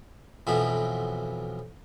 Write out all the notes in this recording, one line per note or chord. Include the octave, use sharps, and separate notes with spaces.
B1 F2 B2 E3 F3 B5